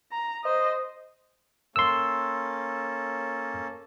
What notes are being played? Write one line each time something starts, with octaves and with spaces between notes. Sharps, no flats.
A#5
C5 D#5
A#3 C#4 A4 C6 E6